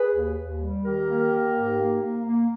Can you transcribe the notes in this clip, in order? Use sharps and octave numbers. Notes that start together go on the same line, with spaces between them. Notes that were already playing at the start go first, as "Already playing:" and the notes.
Already playing: G#4 B4
D#2
D#2
G3
D#3 G4 A#4
A#3
A#3
G#2
A#3
A#3
A#3